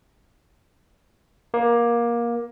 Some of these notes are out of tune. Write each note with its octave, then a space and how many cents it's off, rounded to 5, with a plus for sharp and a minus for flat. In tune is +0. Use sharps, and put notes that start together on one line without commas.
A#3 +20